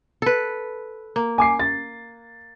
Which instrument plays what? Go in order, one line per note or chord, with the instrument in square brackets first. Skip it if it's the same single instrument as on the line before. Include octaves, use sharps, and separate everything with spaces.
[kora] A4 B4
A#3
[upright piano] G#5 D6 C7
A6